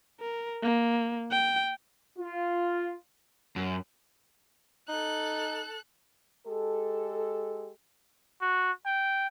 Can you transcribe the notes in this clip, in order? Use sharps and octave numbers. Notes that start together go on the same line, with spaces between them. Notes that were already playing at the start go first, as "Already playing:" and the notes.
A#4
A#3
G5
F4
F#2
D#4 A4 F#6
G#3 G4 A4
F#4
G5